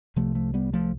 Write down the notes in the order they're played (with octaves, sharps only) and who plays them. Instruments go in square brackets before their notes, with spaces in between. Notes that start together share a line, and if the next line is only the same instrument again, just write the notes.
[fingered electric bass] C2 C3 F3 A3
F3 A3
G3 B3
F3 A3